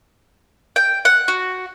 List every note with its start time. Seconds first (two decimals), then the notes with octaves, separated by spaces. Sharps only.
0.76 G5
1.05 F#5
1.28 F#4